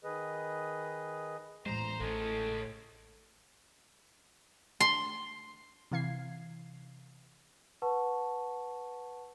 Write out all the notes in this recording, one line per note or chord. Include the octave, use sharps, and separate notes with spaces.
D#3 G#4 B4 D#5
A1 E2 G#3 C5 A#5
A1 A2 G#3 C#4 A4
C6
C3 E3 F5 G#6 C7
B4 F#5 A5 C#6